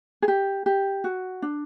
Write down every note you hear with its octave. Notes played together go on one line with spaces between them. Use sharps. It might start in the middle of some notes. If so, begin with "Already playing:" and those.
G#4
G4
G4
F#4
D4